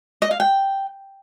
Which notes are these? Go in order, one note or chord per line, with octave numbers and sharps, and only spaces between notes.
D#5
F5
G5